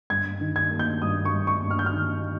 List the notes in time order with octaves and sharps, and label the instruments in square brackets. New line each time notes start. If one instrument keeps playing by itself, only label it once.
[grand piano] G2 G#6
D#3
G#6
A#3
G6
G2 D#6
C#6
G2
C#6
G2
F6
G6
F6
D#3